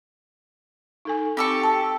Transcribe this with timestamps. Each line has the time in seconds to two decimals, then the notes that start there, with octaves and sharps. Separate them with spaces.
1.05 D#4 A4 G#5
1.37 C4 G4 A4 C#6
1.62 G5 A5 E6